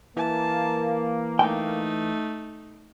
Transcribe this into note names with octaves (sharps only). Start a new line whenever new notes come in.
E3 A#3 A5
A3 D#4 G5